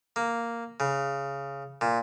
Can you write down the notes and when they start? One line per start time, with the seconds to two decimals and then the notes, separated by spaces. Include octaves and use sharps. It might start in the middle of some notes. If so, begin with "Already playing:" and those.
0.16 A#3
0.80 C#3
1.81 A#2